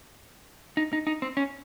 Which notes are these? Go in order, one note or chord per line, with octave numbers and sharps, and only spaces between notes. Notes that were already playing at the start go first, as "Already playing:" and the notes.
D#4
D#4
D#4
C4
C#4